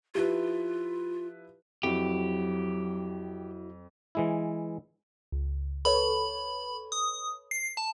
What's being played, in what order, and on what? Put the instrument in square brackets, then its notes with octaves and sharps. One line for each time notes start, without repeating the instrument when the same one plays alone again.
[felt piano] F3 E4 B4 [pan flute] F4 [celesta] G4
[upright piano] F2 [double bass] F#3 [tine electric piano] E4 F#4 [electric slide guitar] G4
[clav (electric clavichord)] E3 G#3 E4
[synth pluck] C#2
[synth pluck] A4 B4 C#5 [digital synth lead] B5
[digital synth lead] D#6
C7
A5